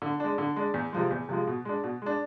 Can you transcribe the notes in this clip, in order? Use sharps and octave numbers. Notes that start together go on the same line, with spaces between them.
D3
G#3 D4
D3
G#3 D4
E2
C3 F3 G#3
E2
C3 F3 G#3
B2
G#3 D4
B2
G#3 D4